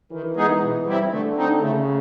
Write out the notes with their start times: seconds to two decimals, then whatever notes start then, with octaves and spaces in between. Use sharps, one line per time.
0.12 D#3 E3
0.37 G#3 B3 D#4 G#4
0.61 B2
0.86 G3 C4 E4
1.12 D3 A3
1.36 C4 D#4
1.61 C#3 A3